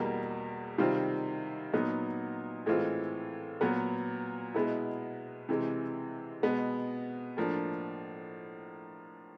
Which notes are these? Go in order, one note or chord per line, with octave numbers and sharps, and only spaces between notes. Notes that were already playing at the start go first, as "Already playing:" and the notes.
Already playing: E2 B2 G3 A#3
C3 D#3 G3 C4 F4
A#2 F#3 B3 D#4
A2 E3 G#3 C4 F4
A#2 F#3 B3
B2 G#3 B3 E4
C3 E3 G#3
B2 G#3 B3
A2 F3 A#3 D4